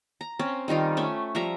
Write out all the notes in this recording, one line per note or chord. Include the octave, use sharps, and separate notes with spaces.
A#5
C4 C#4
D#3 G3 D#4 F4
A3 C#4 E5
F3 G3 E5 A#5